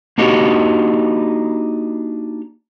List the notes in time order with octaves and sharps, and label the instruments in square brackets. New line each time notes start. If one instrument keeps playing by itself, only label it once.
[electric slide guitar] A#3 D4 D#4 F#4 G4